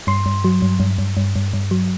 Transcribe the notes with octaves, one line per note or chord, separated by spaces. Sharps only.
G2 C6
G2
F#3
G2
G2
G2
G2
G2
G2
F#3